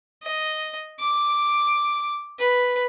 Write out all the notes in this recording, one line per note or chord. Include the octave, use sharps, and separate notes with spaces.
D#5
D6
B4